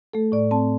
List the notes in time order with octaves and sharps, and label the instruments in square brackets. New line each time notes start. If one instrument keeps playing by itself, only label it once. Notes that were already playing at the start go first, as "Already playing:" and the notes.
[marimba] A3 A4
A2 D5
C4 A5